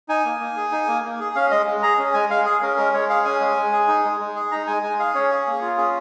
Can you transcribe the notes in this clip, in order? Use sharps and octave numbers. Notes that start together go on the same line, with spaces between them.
D#4 G#5
A#3
A#3
G#4
D#4
A#3
A#3
G#4
C#4 F5
G#3 D#5
G#3
G#4 A#5
C#4
G#3 G#5
G#3 F5
G#4
C#4 A#4
G#3 A#4
G#3 C#5
G#4 F5
C#4 G#5
G#3
G#3
G#4
D#4
G#3
G#3
G#4
D#4 A#5
G#3 G#5
G#3 G#5
G#4 F5
C#4 C#5
G#4
A#3
F4
C#4 G#4